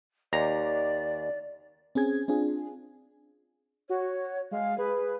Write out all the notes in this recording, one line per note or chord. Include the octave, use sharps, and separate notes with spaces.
D#2 D5 A#5
C4 C#4 G#4 G#6
C4 D4 F4 G#4
F#4 C#5
G#3 F5
G#4 B4